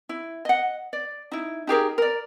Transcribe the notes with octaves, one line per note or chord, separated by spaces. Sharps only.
E4
D#5 F#5
D5
D#4 E4
D#4 G4 G#4 A#4
A#4 D5